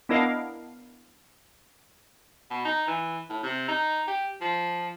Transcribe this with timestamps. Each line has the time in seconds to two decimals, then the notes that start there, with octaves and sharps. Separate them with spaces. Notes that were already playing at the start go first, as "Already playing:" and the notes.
0.09 B3 D4 E4 A#4 D#5 F5
2.51 B2
2.65 D#4
2.87 E3
3.30 A2
3.43 C3
3.68 D#4
4.08 G4
4.41 F3